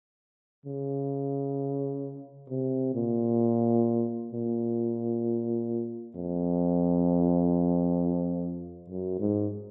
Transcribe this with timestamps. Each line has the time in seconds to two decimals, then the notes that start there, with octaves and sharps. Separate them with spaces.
0.66 C#3
2.50 C3
2.95 A#2
4.33 A#2
6.15 F2
8.90 F#2
9.19 G#2